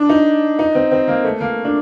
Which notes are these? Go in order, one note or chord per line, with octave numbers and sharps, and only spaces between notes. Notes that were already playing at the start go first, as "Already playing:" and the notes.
Already playing: D4
D#4
D#4
C4
C4
A#3
A3
A#3
D4